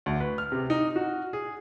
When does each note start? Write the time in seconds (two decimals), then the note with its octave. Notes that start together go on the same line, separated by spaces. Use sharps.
0.06 D2
0.20 B4
0.38 F6
0.52 C3
0.70 D#4
0.96 F#4
1.33 G#4